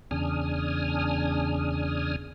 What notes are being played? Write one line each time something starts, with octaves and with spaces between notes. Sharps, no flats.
E2 C#3 D4 G#5 D#6 F6